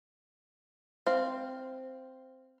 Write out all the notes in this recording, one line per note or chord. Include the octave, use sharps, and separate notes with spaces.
C4 F5